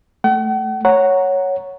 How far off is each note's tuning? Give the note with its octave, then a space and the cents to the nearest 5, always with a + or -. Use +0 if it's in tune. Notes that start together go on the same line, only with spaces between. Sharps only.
A3 -10 F#5 +45
C#5 +0 F#5 +0 A#5 +0